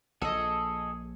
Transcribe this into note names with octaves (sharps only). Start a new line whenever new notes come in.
A#1 G#4 A4 D#5 G#5